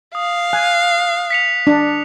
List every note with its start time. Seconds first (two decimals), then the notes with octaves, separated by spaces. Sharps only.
0.15 F5 D#6
0.53 G#5 F#6
1.30 B6 C#7 F7
1.67 D4